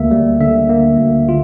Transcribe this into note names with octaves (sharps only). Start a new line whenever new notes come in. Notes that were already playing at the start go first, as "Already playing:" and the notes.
Already playing: D2 A#3 E5
G3
D3 E5
A#3
D2
F4